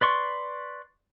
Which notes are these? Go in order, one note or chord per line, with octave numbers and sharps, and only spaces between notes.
B4 D5 C6 C#6